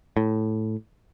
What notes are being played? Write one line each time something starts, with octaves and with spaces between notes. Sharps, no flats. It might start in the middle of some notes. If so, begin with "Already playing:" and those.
A2